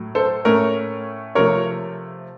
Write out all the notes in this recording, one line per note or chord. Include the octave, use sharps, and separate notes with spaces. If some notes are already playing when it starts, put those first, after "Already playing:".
Already playing: A2 F#3
A4 C5
A2 A3 C#4 A#4 C#5
C3 F3 A3 A#4 C#5